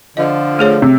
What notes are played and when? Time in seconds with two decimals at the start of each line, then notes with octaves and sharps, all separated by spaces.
0.17 D3 F3 D#5
0.59 A3 G#4 C#5
0.82 C3